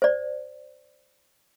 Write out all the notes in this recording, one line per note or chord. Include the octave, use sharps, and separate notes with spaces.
C5 D5